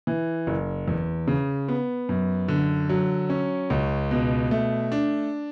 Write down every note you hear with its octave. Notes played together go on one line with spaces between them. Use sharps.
E3
F#1
E2
C#3
B3
F#2
D3
F#3
C#4
C#2
B2
A3
D4